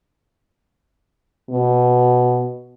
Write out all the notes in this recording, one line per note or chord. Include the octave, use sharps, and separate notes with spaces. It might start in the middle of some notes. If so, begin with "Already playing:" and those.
B2